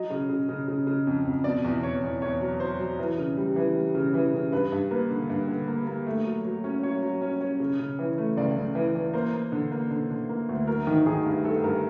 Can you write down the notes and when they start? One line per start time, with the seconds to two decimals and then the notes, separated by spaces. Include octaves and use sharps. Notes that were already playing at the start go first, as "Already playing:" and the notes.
Already playing: F#3 D#5
0.10 C#3
0.29 C#3
0.49 C#3
0.68 C#3
0.87 C#3
1.07 F2
1.25 F2
1.44 B2 D5
1.64 E2
1.83 E2 C#5
2.03 E2
2.22 E2 C#5
2.41 F#3
2.60 F#3 C5
2.80 F#3
2.99 E3
3.18 C#3
3.37 G3
3.56 E3
3.76 G3
3.95 C#3
4.14 E3
4.33 C#3
4.52 G2 B4
4.72 G2
4.91 A#3 B4
5.11 D3
5.29 G2
5.48 D3
5.68 A#3
5.87 A#3
6.06 A3
6.25 F#3
6.45 F#3
6.64 C#4
6.83 F#3 C#5
7.02 F#3
7.21 C#4
7.41 C#4
7.60 C#3
7.79 C#3
7.99 E3
8.18 A3
8.37 C#2 D5
8.57 C#2
8.75 E3
8.95 E3
9.13 A#3 C5
9.33 A#3
9.52 D3
9.72 A#3
9.91 D3
10.10 D3
10.29 A#3
10.49 D2
10.67 F#3 A#4
10.87 D#3
11.06 D#3 G#4
11.25 G2
11.44 G2 A4
11.64 G2 A#4